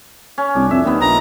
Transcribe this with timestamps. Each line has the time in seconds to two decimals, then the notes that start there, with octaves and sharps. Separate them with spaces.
0.38 C#4
0.55 C2 D4
0.71 F2 E5
0.85 D#2 D#3 B3
1.01 A#1 A#5